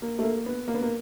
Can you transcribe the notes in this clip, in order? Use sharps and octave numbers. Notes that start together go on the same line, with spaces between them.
A#3
A3
A#3
B3
A#3
B3
A#3